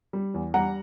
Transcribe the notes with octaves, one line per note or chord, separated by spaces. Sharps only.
G3
E2
G3 F#5 A#5